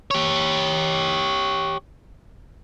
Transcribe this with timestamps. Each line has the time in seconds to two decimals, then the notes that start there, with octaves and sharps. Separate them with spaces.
0.11 G4 C#5